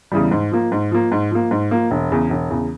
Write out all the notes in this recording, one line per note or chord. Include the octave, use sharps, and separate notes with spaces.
E2 C#3 E3 G3
G#2
F3 A#3
G#2
F3 A#3
G#2
F3 A#3
G#2
F3 A#3
E1
E2 C#3
E1
E2 C#3